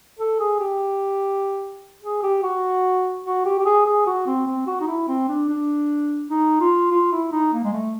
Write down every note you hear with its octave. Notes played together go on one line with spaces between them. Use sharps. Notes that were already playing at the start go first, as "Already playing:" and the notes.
A4
G#4
G4
G#4
G4
F#4
F#4
G4
G4
G#4
G#4
F#4
C4
C4
F#4
D#4
E4
C4
D4
D4
D#4
F4
F4
E4
D#4
A#3
G#3
A3